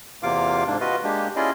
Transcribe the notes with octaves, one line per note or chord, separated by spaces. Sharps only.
E2 C3 A#3 F4 F5 D6
G#2 C3 A#3 D4
F4 F#4 B4 D#5
G#3 A#3 D4 G4
C#4 E4 F4 G#4 D5 D#5